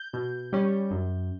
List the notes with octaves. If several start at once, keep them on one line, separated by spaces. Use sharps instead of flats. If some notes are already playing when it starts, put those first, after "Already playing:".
Already playing: G6
B2
G3 C#4
F#2